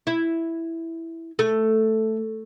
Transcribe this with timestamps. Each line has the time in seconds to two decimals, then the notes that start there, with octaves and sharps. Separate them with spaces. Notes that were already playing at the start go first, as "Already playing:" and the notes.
0.07 E4
1.39 A3